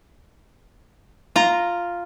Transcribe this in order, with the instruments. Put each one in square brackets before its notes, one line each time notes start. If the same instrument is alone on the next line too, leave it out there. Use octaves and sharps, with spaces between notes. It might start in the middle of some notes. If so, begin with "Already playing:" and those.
[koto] F4 A#5